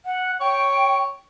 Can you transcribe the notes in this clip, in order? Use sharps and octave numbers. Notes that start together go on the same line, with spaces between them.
F#5
C#5 G5